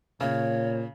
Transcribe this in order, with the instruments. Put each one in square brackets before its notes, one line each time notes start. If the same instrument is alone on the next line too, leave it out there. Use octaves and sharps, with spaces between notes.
[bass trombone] A#2 [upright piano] C#3 [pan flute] C#5